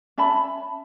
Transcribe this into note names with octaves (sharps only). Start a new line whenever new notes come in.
C#4 E5 A5 B5